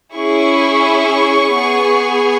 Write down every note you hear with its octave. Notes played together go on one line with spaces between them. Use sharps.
C#4 E4 G#4 C#6
B3 G#4